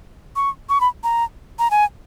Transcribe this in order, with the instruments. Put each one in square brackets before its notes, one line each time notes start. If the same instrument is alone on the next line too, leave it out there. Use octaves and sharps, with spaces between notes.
[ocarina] C#6
C#6
B5
A#5
A#5
G#5